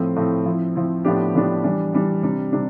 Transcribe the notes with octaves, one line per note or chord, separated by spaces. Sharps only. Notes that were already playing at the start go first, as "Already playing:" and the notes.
Already playing: A2 F3 A3 C4
A2 F3 A3 C4
F3 C4 E4
F3 C4 E4
A2 F3 B3 D4 G4
A2 F3 B3 D4 G4
E3 G3 D4
E3 G3 D4
C3 G3 D4
C3 G3 D4